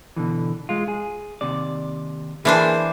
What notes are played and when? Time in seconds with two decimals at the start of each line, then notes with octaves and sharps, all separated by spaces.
0.16 B2 D3 E3
0.69 G#3 F4
0.88 G#4
1.41 D#2 C3 D5
2.45 E3 A#3 D4 G#4 C5